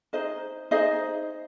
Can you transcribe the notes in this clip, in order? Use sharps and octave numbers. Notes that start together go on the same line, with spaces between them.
D#4 G#4 C5 D#5
D#4 G#4 C5 D#5